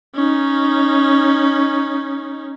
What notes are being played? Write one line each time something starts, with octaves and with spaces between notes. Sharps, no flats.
C#4 D#4